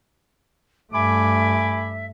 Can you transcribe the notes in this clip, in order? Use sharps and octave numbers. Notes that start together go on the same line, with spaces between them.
G2 A3 E5 G#5 B5 D6